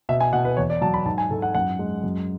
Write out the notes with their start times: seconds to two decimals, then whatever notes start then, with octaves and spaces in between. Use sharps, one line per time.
0.09 B2 E5
0.21 G#5
0.33 B2 F#5
0.45 B4
0.57 E2 C#5
0.70 D5
0.81 F#3 A5
0.94 B5
1.05 G#2 A5
1.18 G#5
1.30 G#2 A4
1.42 F#5
1.55 F#2 F#5
1.79 G#3
2.03 F#2